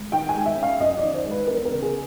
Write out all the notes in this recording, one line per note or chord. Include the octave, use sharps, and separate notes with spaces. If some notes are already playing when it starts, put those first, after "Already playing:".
Already playing: G#3
D#3 G5
G#5
G#3
E5
C#4
F5
F#2 D#5
D#3 D5
C5
G#3
B4
E2 A#4
A#4
C#3
G#4